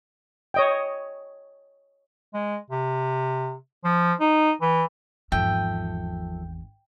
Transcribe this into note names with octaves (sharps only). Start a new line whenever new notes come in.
C#5 D#5 G5
G#3
C3
F3
D#4
E3
G#1 E2 F3 A4 E5 G5